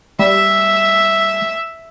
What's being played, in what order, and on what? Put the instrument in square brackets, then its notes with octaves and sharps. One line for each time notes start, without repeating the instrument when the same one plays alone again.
[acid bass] G3 [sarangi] E5